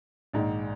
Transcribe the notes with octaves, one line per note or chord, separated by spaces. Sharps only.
A#1 G#2 D#3